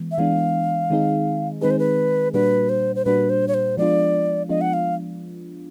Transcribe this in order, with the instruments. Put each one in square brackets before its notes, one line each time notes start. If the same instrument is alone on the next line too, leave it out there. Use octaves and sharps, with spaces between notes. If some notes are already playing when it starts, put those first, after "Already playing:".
Already playing: [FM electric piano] E3 G#3 B3
[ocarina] E5
[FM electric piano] E3 G#3 B3 D4 [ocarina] F5
[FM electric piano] D#3 G#3 C4 D#4 G#4
[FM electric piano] D#3 G#3 C4 D#4 G#4 [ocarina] B4
[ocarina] C5
B4
[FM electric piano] A#2 G3 A#3 D4 F#4 [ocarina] B4
[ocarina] C5
C5
[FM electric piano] A#2 G3 A#3 D4 F#4 [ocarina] B4
[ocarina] C5
C#5
C5
[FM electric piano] F3 G#3 B3 D4 F4 [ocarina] D5
[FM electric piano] F3 G#3 B3 D4 F4 [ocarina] D#5
[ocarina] F#5
F5